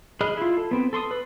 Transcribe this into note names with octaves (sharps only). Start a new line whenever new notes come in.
G#4 D#5 B5 F6 F#6
E4 F4
A4
B3 C4
A4 C6 C#6 D#6
B4